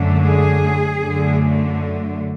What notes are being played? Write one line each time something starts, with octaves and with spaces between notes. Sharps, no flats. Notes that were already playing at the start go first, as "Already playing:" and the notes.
Already playing: F#2 D3 A3
G#4
F#2 D3 A3